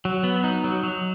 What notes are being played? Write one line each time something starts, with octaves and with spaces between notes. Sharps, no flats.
F#3
B3
D#4
F#3
F#3